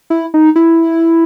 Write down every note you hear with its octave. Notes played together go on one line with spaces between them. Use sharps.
E4
D#4
E4